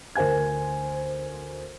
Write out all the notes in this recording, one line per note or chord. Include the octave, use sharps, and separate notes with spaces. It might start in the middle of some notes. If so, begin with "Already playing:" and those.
D2 A#4 C5 G#5 G#6